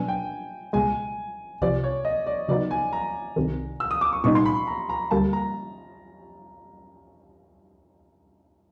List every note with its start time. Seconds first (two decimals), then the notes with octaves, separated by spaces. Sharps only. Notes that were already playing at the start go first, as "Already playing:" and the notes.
Already playing: B2 F#3 B3 D4 G#5
0.08 G5
0.73 C#2 B2 G#3 G#5
1.61 C2 C3 F3 D5
1.84 C#5
2.05 D#5
2.27 D5
2.48 C#3 F#3 B3 D#4 D5
2.71 G#5
2.93 A#5
3.36 C2 C3 D#3
3.80 E6
3.91 D#6
4.01 D6
4.13 C#6
4.24 C2 A#2 G3 B3 D#4 C#6
4.35 C6
4.46 B5
4.67 A#5
4.89 A#5
5.11 D2 D3 G3 A#3 A5
5.33 A#5